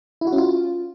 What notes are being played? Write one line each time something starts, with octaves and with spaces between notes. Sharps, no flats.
E4
F#4
C#4
F4